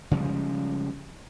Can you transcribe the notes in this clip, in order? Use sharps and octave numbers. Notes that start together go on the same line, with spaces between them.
C#3 F3 G3 G#3